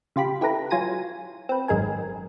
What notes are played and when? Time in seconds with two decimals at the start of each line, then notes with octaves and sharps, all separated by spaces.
0.16 C#3 F4 G4 B5
0.41 E4 G4 A4 B4 A#5
0.70 F#3 F4 G#5 A#6 D#7
1.49 C4 B4
1.68 G#1 F#2 G#3 A#4 G#5